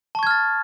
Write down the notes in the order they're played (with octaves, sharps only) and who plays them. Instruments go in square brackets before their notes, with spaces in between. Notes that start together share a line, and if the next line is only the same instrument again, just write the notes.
[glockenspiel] A5
C#6
G#6
F6
A6